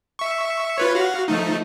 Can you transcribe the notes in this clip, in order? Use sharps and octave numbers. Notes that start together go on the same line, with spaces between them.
E5 C#6
F4 B4 C#5
F#4 F5
F3 A3 D#4